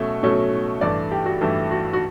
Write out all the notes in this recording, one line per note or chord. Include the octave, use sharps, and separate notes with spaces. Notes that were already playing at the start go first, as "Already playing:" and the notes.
Already playing: B2 F#3 A3 C#4 E5
B2 F#3 A3 C#4
G2 E3 A3 D5
G4
F#4
G2 E3 A3 E4
F#4
F#4